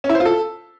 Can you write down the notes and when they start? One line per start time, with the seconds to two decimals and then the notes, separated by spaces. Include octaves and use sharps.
0.04 C#4
0.09 E4
0.15 C5
0.20 F4
0.25 A4